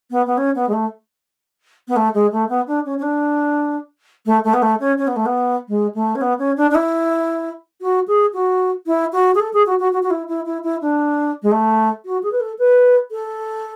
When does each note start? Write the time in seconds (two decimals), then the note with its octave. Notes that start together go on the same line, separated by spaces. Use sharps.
0.11 B3
0.26 B3
0.37 C#4
0.55 B3
0.68 G#3
0.73 A3
1.88 B3
1.96 A3
2.14 G#3
2.32 A3
2.49 B3
2.67 D4
2.85 C#4
2.98 C#4
3.02 D4
4.26 A3
4.44 A3
4.53 B3
4.62 A3
4.80 C#4
4.98 C#4
5.07 B3
5.16 A3
5.26 B3
5.68 G#3
5.94 A3
6.15 C#4
6.21 B3
6.39 C#4
6.57 D4
6.70 D4
6.75 E4
7.81 F#4
8.07 G#4
8.33 F#4
8.86 E4
9.12 F#4
9.35 G#4
9.40 A4
9.53 G#4
9.66 F#4
9.79 F#4
9.92 F#4
10.03 F#4
10.10 E4
10.28 E4
10.46 E4
10.63 E4
10.81 D4
11.42 G#3
11.51 A3
12.05 F#4
12.23 G#4
12.32 B4
12.40 A4
12.58 B4
13.11 A4